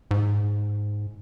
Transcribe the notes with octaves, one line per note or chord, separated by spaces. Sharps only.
G#2